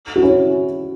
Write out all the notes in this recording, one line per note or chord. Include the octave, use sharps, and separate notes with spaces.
F#4
C#4 E4